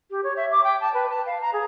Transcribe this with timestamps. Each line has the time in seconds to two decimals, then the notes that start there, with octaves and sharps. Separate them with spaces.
0.11 G4
0.24 C#5
0.37 E5
0.52 D6
0.64 G5
0.81 A5
0.94 B4
1.10 A5
1.26 F5
1.41 A#5
1.53 G#4